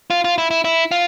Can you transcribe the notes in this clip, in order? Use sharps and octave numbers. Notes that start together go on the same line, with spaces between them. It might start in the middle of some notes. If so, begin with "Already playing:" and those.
F4
F4
E4
E4
E4
F4